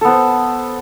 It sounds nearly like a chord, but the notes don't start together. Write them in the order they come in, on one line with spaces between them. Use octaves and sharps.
A4 B3 C5